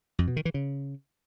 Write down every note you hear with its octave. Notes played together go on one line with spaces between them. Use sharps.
F2
B2
D#3
E3
C#3